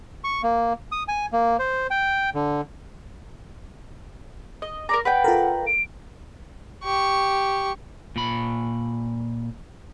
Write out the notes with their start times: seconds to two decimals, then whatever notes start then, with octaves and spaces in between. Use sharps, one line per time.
0.24 C#6
0.43 A#3
0.92 D#6
1.08 G#5
1.33 A#3
1.59 C5
1.91 G5
2.34 D3
4.62 D#5
4.89 A#4 D5 A#5 D6
5.05 B4 D5 F#5 G5
5.24 F4 A4 A#4
5.67 D7
6.84 G4 C#6
8.16 A#2 B5